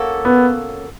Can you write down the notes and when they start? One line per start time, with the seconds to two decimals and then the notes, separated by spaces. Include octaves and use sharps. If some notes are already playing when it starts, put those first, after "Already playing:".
Already playing: A#3 C#4 F#4 A4
0.25 B3